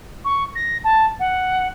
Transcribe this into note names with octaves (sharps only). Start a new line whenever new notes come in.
C#6
A#6
A5
F#5